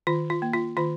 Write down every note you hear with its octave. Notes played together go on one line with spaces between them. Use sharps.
D#3 F4
F4
A#3
F4
D#3 F4